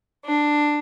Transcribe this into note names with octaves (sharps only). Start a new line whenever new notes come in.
D4